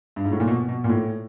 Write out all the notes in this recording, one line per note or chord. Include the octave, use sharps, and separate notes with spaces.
G2
G#2
A2
A#2
B2
B2
A#2
A2